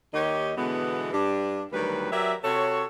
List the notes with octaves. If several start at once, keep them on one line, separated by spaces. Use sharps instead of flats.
D#2 D#3 A#3 G4 C#5 D#5
B2 D3 E3 G#3 B3
G2 D4 G4
D2 D#3 F#3 G3 B4
F#3 G4 A#4 D5 E5
C3 F#4 A4 C#5